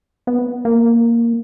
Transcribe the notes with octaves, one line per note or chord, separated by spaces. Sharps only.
B3
A#3